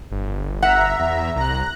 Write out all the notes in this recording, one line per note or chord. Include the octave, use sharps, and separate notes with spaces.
G1
E5 F#5 A#5
E2
C2 A#5 F#6